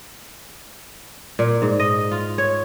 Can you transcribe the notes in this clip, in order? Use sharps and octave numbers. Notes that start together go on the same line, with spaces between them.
A#2
G#2
D#5
F4
C#5